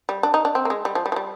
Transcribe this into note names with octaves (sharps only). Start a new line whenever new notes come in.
G3
D4
D#4
D4
C4
A#3
G#3
G3
F3
G3
F3
G3